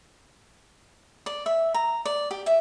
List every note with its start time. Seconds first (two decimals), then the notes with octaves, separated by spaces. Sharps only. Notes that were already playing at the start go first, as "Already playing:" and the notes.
1.26 D5
1.46 E5
1.74 A#5
2.05 D5
2.31 G4
2.46 E5